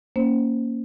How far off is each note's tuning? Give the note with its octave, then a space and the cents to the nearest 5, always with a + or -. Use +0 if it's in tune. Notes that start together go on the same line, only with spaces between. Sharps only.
A#3 +0 C#4 +0 C5 +0